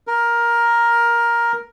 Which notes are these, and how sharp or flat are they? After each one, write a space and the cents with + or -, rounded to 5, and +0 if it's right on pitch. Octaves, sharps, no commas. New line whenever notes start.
A#4 +10